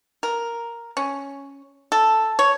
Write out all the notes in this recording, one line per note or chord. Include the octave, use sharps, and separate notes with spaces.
A#4
C#4
A4
C#5